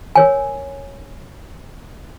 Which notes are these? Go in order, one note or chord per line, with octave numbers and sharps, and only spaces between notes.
A#4 C#5 G#5